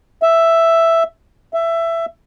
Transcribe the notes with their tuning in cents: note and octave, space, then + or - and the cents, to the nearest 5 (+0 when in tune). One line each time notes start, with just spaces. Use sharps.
E5 +5
E5 +15